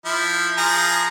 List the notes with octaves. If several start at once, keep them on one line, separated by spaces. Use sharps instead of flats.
F3 E4
F3 G#4 A#5